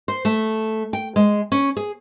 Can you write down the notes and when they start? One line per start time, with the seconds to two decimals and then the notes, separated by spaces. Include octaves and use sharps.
0.08 C5
0.25 A3
0.93 G5
1.16 G#3
1.52 C#4
1.77 G#4